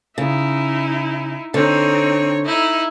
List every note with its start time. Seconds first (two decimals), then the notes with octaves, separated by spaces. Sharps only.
0.18 C#3 D#4 E4
1.54 D3 C4 D#4 C#5
2.45 D#4 E4